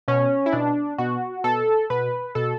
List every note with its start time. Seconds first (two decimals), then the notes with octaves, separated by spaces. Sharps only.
0.08 B2 C#4
0.46 E4
0.53 B2 D4
0.98 B2 F#4
1.44 B2 A4
1.90 B2 B4
2.35 B2 A4